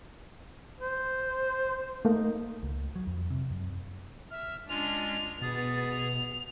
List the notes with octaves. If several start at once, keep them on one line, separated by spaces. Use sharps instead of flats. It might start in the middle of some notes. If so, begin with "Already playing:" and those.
C5
A3 A#3 D#4
C#2
F#3
F2
C3
F#2
E5 F6
G#3 C#4 D4 F4 F7
B2 B3 G#4 A6
F7